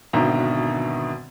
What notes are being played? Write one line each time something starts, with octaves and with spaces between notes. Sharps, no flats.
G#1 B2 D3 D#3 E5 A#5